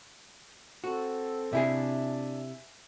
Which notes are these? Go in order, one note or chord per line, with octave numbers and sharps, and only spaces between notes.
C4 F#4 A4
C3 D4 E4 G#4 E5 G#5